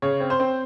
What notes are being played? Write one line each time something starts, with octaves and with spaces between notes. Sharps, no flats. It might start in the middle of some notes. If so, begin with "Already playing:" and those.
C#3 C#5
C4
C5
C4